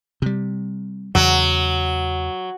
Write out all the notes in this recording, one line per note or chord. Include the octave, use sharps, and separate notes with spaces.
C3 G3
E2 C#3 F#3